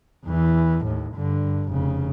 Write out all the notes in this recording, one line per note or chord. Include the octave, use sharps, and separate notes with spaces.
E2 E3
D#2 A2
G2 D3
F1 C#3